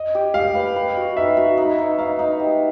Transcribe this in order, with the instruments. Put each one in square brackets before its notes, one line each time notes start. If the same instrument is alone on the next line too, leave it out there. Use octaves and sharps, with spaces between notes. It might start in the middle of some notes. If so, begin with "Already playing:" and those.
Already playing: [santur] D#5
G4
[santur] G4 [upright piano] F5
[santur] B4
B4
F#4
[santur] D#4 [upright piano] E5
[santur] F#4
D#4
D#4
[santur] D#4 [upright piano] F5
[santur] D#4
G4